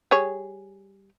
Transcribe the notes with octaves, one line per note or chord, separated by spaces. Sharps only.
G3 G#4 C#5